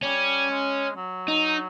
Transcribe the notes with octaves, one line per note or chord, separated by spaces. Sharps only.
G3 C#4
G#3
F#3
D#4